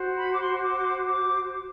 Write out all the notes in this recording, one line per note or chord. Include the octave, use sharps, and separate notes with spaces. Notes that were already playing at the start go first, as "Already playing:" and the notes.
Already playing: F#4 C5
B5
D6
C6
D6
D6